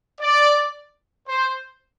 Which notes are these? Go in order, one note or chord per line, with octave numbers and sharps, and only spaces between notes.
D5
C5